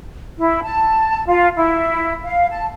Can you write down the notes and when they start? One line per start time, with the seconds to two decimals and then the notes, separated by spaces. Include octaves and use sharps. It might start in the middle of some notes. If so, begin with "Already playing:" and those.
0.39 E4
0.64 A5
1.27 F4
1.56 E4
2.23 F5
2.50 A5